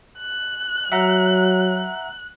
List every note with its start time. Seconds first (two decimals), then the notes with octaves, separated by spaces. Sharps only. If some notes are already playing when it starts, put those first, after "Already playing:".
0.19 F#6
0.92 F#3 E5 F#5 A#5